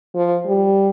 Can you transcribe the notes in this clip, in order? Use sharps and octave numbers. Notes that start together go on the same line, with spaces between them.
F3
G3